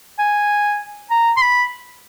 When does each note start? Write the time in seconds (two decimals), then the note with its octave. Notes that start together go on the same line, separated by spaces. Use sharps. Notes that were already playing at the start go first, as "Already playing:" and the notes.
0.19 G#5
1.10 A#5
1.37 C6
1.41 B5